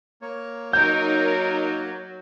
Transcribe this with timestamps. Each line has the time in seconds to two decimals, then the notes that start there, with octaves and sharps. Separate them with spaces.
0.22 A#3 C#5
0.73 F#3 D#4 A#4 G6